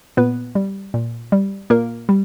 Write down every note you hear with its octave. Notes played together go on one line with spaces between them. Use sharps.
A#2 B3 B4
G3
A#2
G3
A#2 A#3 A#4
G3